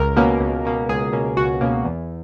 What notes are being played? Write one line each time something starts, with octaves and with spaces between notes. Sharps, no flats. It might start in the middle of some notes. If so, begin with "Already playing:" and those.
Already playing: C#2 A#4
B2 A#3 C#4
C#2
B2 A#3 C#4
C#2 G#4
B2 A#3 C#4
C#2 F#4
B2 A#3 C#4
E2